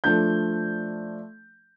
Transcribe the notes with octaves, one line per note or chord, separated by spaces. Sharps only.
F3 A3 D4 G6